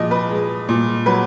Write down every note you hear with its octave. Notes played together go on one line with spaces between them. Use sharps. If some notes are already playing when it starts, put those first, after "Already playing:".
Already playing: A#2 F3 D#5
B4
G#3
A#2
F#3 B4